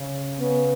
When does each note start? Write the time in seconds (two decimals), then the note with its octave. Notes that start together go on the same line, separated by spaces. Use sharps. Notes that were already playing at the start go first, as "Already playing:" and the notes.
Already playing: C#3
0.39 C#3 B3